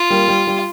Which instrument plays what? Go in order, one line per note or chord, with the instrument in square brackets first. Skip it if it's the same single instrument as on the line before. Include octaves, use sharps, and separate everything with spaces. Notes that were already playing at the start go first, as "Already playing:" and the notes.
Already playing: [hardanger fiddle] F4
[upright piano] G3 A#3
G3
G3